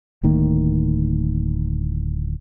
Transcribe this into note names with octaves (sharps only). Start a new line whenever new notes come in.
D1 A2 D#3 A#3